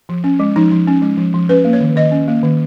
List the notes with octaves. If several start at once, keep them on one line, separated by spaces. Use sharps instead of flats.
F3
C#4
G#3
F3 D#4
F3
C#4
G#3
F3
F3
C#4 B4
A#3
C#5
D#3
D#3 D#5
C#4
A#3
D#3